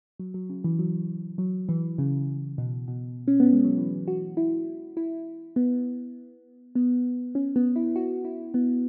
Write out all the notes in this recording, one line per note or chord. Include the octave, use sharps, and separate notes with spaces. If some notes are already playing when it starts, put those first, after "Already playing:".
F#3
F#3
C#3
E3
F#3
F#3
E3
C#3
B2
B2
C#4
B3
G#3
F#3
E3
F#4
E4
E4
B3
B3
C#4
B3
E4
F#4
E4
B3